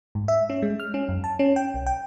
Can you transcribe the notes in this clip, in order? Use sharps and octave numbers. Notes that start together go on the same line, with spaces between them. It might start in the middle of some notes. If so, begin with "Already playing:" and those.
G#2
E5
C#4
G#3
F6
C#4
F#2
A5
C#4
G5
B1
G5